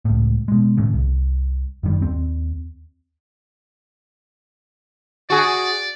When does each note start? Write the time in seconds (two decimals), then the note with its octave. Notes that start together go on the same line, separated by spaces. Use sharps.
0.05 C#2 A2
0.48 B2 G#3
0.77 D#1 D#2 A2 C#3
0.94 C2
1.83 F#1 F#2 D#3 G3
2.02 D#2 C4
5.30 F#4 G#4 D5